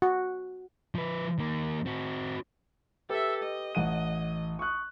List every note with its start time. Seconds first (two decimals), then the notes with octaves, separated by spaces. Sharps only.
0.02 F#4
0.95 F3 B4
1.38 D#3 A#3
1.86 C4 F#4
3.10 G4 A4 B4 E5
3.43 D#5
3.75 A1 F#5 D#7
4.59 C#6 D#6 F#6